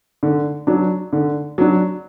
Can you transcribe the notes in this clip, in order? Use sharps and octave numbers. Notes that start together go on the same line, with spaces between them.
D3
F#3 D4
D3
F#3 D4